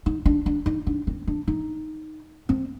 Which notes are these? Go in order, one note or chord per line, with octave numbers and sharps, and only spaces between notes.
D#4
D4
D4
D#4
D4
C4
D4
D#4
C4